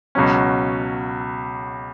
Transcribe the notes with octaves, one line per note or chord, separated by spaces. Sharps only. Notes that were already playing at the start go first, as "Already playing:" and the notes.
C#2 B2 F#3 C#4